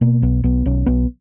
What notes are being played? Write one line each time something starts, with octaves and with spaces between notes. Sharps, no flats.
B2 A#3
B1 B3
B1 B3
B1 C#4
B1 B3